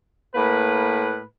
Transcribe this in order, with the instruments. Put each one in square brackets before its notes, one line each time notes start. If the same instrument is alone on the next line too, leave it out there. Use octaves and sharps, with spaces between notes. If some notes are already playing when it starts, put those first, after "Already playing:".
[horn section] A2 A#3 B4